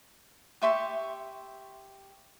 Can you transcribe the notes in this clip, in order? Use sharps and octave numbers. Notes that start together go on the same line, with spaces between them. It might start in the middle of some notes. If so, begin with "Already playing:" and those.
G4 E5 C6 C#6